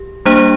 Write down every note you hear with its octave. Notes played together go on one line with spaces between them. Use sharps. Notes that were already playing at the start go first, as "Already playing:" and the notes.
Already playing: G4
G3 A#3 D4 G4 C5